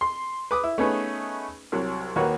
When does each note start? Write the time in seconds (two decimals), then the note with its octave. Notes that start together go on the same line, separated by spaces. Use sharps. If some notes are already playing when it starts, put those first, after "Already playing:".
0.01 C6
0.51 B4 D6 D#6
0.64 E4
0.78 A3 B3 C#4 D#4 G#4 B4
1.72 C2 F#3
2.16 D#2 D#3 A#3 F#4 B4 C#5